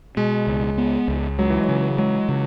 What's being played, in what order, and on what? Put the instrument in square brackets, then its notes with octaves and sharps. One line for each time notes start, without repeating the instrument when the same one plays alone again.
[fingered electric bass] B2 [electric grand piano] G#3
[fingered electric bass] C#2
B3
C#2
[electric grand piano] F#3 [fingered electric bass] G#3
[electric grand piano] E3
[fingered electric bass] C#3 [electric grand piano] F#3
[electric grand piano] F#3 [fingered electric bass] G#3
[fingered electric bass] C#3